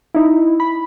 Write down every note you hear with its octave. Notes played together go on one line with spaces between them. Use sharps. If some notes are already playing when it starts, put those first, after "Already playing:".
D#4 E4
B5